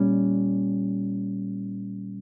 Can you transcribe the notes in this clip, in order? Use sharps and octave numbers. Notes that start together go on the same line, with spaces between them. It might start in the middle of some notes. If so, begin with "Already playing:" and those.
Already playing: A#2 G3 C#4